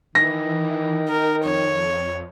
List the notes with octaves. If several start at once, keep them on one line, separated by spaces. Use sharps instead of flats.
D#3 E3 A#6
A#4
F2 C#5